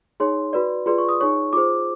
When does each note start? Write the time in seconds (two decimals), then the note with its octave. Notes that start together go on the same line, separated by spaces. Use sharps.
0.20 D#4 G#4 C#5 C6
0.53 F#4 B4 D5
0.86 F4 G#4 B4 D5 C6
0.98 C#6
1.09 D#6
1.20 D#4 G#4 C#5 C#6
1.53 F4 G#4 C5 D6